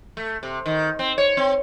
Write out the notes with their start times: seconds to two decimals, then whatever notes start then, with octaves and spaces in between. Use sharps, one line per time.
0.17 A3
0.43 C3
0.66 D#3
0.99 C4
1.18 C#5
1.37 C4